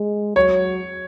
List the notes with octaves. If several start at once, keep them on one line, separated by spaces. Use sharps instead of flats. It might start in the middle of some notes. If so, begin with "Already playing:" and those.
Already playing: G#3
F#3 C#5